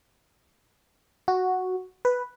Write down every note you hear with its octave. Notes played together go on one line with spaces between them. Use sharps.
F#4
B4